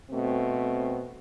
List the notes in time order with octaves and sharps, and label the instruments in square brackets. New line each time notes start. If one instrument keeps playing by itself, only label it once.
[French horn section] B2 A3 C4